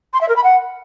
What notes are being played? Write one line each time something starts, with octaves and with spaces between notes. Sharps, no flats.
C6
E5
A#4
B5
F#5